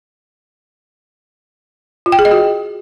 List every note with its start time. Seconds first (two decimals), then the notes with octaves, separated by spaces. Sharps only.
2.06 F4
2.12 G5
2.19 G#4
2.25 D#5
2.31 F#4